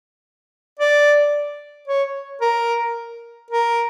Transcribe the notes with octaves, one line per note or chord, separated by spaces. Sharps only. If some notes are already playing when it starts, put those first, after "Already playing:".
D5
C#5
A#4
A#4